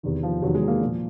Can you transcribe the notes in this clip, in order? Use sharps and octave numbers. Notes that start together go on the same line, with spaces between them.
E2 C3 D#3
F3
E2 C3 D#3 F#3
G#3
A#3
A#2 F3